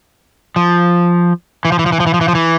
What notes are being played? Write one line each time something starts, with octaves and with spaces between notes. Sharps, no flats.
F3
E3
F3
E3
F3
E3
F3
E3
F3
E3
F3
E3